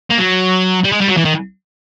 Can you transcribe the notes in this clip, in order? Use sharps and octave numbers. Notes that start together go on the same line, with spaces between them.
A#3
F#3
G3
G#3
G3
F#3
E3
D#3